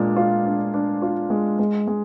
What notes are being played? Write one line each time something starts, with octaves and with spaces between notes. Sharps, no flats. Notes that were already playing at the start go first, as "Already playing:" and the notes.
Already playing: A#2 G#3 D4
F4
D4
D4
F4
G#3
G#3
G#3